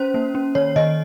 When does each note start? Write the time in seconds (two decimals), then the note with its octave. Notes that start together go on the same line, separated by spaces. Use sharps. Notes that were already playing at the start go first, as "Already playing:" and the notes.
Already playing: C#4 C5
0.14 A#3
0.35 C#4
0.55 D#3 C#5
0.76 D#3 D#5